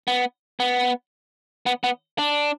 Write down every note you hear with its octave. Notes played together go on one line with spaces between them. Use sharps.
B3
B3
B3
B3
D4